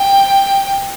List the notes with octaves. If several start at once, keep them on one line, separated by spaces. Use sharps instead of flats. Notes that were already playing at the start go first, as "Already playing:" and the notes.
Already playing: G5